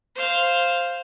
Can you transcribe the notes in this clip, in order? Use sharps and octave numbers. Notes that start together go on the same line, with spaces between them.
C5 F5